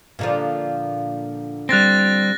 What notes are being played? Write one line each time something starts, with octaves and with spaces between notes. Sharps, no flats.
A#2 D3 F3
G3 C4 F#6 A6 A#6